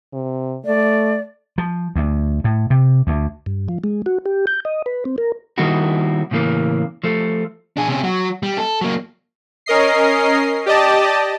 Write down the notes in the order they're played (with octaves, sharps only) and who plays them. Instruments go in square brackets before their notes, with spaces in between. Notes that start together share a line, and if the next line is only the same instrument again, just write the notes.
[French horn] C3
[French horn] A3 [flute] D5
[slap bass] F3
D2
A2
C3
D2
[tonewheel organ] G2
F3
G#3
F#4
G4
G6
D#5
B4
C4
A#4
[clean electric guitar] D#3 G3 A#3 D#4 E4 F#4
A2 C#3 E3 G3 A#3
F3 A3
[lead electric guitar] D4 G#4
C3 C#4
F#3 F#4
G3
A4
F#3 A#3
[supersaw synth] C#4 A#4 D#5 C7
G4 D5 D#5 A5